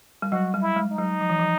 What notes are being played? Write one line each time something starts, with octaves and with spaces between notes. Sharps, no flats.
G3
F#3 F#4
G3
E4
G#3
D#4
F#3
F3
E3
F3